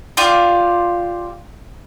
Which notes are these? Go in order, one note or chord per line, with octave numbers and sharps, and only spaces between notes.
F4 G4 D5 F5